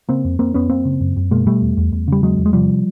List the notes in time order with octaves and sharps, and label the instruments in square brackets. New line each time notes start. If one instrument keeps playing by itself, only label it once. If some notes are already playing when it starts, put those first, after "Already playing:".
[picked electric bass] C#3 A#3 C4
F2
F2 A#3 C4
F2 B3 C#4
F#2 A#3 C4
C#3
F#2
F#2
B2 G#3 A#3
B2 G3 A3
E2
E2
E2
C#3 G3
E2 F#3 G#3
E2
G#3
C3 F3 G3